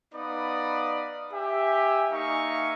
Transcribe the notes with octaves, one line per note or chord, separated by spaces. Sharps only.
B3 D#4 B4 D5 F5 D#6
G4 E5 G#5
A#3 D#4 E5 F5 G#5 C#6